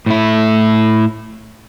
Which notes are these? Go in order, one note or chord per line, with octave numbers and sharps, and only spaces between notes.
A2 E4